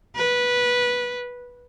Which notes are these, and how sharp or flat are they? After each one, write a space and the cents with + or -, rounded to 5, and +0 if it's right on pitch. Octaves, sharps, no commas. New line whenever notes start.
B4 -15